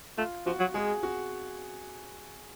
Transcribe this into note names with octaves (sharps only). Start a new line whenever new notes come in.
A3 F4
F3 F#4
F#3
G#3 G#4
F#4